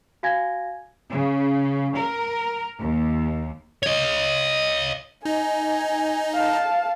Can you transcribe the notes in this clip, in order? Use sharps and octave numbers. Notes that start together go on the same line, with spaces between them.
F#4 F5 G#5 G#6 A#6
C#3
A#4
D#2
C#5 D#5
D#4 G#5
F5 A5